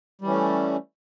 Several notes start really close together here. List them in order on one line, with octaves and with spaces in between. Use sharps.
G3 E3 C#4 A3